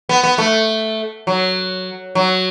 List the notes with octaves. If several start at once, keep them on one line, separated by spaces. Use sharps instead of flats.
B3
B3
A3
F#3
F#3